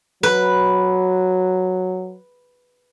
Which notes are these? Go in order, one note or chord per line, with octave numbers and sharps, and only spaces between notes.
F#3 B4